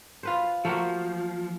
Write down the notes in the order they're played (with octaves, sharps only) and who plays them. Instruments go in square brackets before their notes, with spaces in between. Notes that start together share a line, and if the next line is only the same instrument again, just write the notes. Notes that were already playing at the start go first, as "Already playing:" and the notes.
[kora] F4 B4 C5
[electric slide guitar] F3 [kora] A3 A#3 F#4